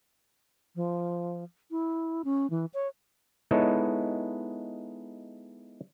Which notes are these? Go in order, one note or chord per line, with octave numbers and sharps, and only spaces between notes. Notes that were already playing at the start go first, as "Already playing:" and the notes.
F3
E4
C#4
E3
C#5
G#3 B3 D#4 E4 A4 C#5